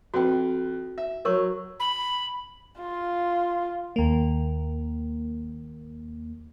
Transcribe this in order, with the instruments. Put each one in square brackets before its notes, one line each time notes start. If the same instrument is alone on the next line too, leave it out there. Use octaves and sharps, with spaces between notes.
[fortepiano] F2 B4 [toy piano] F#4 G5
[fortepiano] E5
[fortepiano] F#3 [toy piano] A#4 C#5 C#6
[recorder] B5
[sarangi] F4
[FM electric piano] D#2 A#3